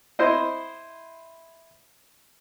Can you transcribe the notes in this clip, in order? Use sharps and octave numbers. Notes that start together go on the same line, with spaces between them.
E4 C5 D#5